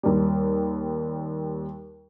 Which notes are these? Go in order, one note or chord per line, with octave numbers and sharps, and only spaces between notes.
D#2 G3